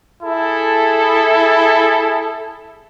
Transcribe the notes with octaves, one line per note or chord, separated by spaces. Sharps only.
E4 G#4 A4